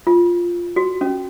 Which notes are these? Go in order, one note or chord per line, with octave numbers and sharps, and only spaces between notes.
F4
F#4
C#4